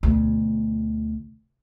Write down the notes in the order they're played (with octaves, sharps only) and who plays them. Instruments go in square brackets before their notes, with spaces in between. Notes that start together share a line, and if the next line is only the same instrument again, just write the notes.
[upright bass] D2 B2